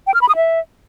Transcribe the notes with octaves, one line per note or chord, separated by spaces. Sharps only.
G5
F6
B5
D#6
E5